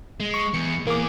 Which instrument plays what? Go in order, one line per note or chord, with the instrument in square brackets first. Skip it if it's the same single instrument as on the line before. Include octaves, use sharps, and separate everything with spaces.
[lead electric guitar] G#3
[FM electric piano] C#6
[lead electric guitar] E2 [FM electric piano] C#7
[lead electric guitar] E3 G#4 [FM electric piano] A#3 D6